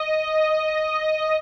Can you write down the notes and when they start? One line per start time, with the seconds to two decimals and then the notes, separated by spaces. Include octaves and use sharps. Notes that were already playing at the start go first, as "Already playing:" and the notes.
Already playing: D#5